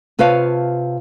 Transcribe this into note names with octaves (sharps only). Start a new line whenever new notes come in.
C3 F4 B4 C#5 F5 A5